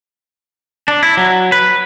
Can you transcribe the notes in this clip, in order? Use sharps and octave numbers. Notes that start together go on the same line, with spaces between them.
D4
E4
F#3
B4